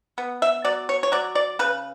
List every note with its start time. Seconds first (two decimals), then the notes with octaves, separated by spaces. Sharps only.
0.18 B3
0.42 E5
0.65 F#3 D5
0.89 C#5
1.03 C#5
1.12 F#3 D5
1.35 D5
1.59 C#3 B4